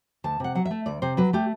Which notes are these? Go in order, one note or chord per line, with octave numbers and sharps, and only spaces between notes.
D2 A5
C3 F#5
F#3 F#5
E5
A3
D2 D5
C3 C5
F#3 B4
A3 G4